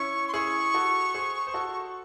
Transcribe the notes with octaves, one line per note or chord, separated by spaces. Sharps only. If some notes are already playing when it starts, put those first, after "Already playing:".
Already playing: C#4 E4 C#6
C6
E4 G#4 C#6
F#4 A4
G#4 C5
C5
F#4 A4